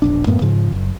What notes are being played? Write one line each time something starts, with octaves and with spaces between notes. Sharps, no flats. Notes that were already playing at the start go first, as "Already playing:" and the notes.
E1 A#1 D4
F#2 A2 A#3 B3
G#2 C#3 F3
F#1